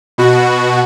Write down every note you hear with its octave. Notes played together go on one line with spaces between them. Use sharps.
B2 F#4